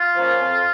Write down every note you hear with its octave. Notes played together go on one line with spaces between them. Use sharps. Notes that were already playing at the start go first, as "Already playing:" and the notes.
Already playing: F4
F3 A#3 C#4
F2